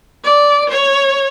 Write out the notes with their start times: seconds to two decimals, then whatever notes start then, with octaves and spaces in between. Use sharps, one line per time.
0.24 D5
0.69 C#5